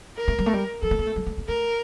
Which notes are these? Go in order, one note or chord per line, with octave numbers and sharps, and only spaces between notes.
A#4
A3
G3
A3
G3
F3 A4
A3
A#3
A3
G3
A3
A#3
A3 A#4